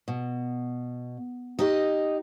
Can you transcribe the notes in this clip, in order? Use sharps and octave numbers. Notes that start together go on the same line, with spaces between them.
B2
D#4 G4 D#5